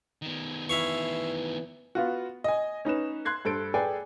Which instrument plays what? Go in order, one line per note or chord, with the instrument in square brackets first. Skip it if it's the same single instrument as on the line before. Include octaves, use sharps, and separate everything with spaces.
[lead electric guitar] D#3 B3
[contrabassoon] E3 [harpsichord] E4 F5 C#6
[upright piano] B3 F4 F#4
D#5 G#5
C#4 D#4 B4 E7
C6 F#6 G#6 C7
G2 A4 C5 D7
G#4 A4 B4 D5 G5 G#5